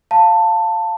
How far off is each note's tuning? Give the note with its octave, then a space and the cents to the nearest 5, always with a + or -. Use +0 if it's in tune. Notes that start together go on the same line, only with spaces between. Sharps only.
F5 +0 A5 +15